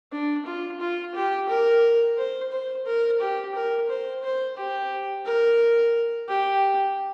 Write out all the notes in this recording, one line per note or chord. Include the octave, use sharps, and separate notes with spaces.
D4
F4
F4
G4
A#4
C5
C5
A#4
G4
A#4
C5
C5
G4
A#4
G4